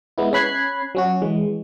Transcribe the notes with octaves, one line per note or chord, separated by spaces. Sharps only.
G#3 B3 E4
C#4 C#5 B5 F#6 G#6 C7
F#3 C#4 F#4
E3 G#3